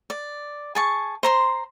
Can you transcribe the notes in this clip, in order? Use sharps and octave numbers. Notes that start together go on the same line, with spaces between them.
D5
G#4 A5 C#6
C5 A#5 C6